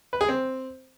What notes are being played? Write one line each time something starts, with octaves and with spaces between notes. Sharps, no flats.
B4
G#4
C4